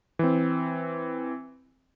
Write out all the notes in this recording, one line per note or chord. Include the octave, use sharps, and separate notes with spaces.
E3 C4